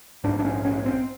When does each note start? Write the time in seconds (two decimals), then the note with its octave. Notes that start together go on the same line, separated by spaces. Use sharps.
0.24 A#1 G#2 D4
0.39 D4
0.45 C#4
0.65 C#4
0.85 C4